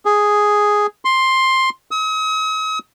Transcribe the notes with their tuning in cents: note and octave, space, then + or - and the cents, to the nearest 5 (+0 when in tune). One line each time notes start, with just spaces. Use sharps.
G#4 +0
C6 +10
D#6 +45